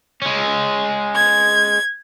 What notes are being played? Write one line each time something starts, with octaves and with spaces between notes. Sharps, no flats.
G#3 C#4
G#6